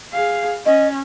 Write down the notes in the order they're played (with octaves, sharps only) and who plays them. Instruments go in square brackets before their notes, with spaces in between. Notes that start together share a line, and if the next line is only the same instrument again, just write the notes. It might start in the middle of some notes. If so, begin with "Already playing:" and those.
[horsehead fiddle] G#4 F5
[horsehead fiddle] C#4 [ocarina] D#5